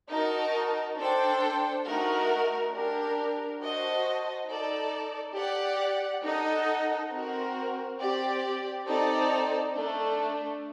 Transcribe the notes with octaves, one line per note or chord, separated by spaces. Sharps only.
D#4 F#4 A#4 D#5 A5
D4 A4 C5 G5
A3 D#4 F#4 A#4
D4 G4 A#4
F#4 C5 D#5 A5
D#4 A4 D5
G4 D5 F#5
D#4 A4 D#5 F#5
C4 F#4 A#4
C4 G4 D5
C4 D#4 A4 D5
A3 D4 A4